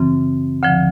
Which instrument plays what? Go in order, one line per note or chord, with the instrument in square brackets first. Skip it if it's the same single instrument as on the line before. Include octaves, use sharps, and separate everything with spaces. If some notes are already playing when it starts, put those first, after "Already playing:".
Already playing: [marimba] F#2 C#3 E3 C4
D2 D3 F3